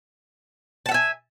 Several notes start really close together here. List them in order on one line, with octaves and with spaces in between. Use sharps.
A5 F#5 E5 G#5